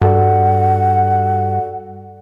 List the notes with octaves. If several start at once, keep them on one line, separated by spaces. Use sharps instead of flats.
G2 F#4 A4 D5 F#5